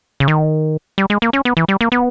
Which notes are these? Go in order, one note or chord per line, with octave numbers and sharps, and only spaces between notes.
C#3
D#3
G3
G#3
A#3
C#4
B3
E3
G3
A#3
B3